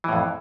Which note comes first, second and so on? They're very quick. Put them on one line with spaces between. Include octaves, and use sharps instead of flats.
E3 A2 F2